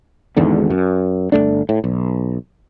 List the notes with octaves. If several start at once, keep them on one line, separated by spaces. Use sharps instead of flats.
G#1 E2 G#2 D3
F#2
G1 G#2 A3 D4
A2
B1